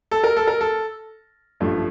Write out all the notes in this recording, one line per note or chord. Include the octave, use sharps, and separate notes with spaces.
A4
A#4
A4
A#4
A4
A1 G2 F3 A3